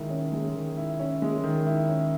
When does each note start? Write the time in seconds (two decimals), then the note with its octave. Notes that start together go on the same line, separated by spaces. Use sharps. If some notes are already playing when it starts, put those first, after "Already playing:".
Already playing: D#3 G#3 E4
0.10 C#4
0.32 G#3
0.55 D#3
0.77 E4
0.99 C#4
1.22 G#3
1.44 D#3
1.66 E4
1.88 C#4